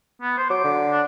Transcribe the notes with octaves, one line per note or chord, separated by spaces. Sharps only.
B3
C5
F#3 D6
D3
D4